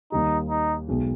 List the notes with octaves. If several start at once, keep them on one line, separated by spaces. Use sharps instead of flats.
D#2 D#3 G3 D#4
D#4
B1 B2 G#3